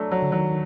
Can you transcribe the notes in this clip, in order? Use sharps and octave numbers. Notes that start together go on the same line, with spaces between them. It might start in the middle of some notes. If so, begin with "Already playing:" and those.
Already playing: F#3 A3 D4
F#3
D3
D#3 F#3